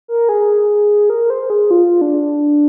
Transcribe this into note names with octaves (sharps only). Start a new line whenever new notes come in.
A#4
G#4
A#4
C5
G#4
F4
D4